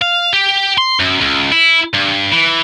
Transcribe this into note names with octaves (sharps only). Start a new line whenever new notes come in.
F5
G4
C6
F#2
C#2
E4
G2
E3